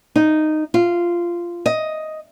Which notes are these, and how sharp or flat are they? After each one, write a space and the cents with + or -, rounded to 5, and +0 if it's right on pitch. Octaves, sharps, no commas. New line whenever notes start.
D#4 -10
F4 -10
D#5 +5